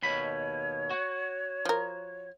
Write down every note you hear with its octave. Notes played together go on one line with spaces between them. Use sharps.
D#2 B2 C#5 B5
F#4
F3 A#4